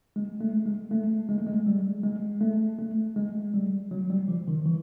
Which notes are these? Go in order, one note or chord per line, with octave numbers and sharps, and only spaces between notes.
G#3
A3
G#3
A3
G#3
A3
G#3
G3
G#3
A3
A3
G#3
G3
F#3
G3
F3
D#3
E3